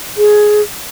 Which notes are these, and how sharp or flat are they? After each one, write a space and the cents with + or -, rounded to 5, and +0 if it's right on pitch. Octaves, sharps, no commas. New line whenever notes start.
G#4 +15